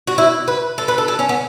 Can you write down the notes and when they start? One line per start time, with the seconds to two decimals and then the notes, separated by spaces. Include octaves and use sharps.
0.07 F#4
0.18 E4
0.48 B4
0.78 A4
0.88 B4
0.98 A4
1.08 A4
1.19 C#4
1.29 B3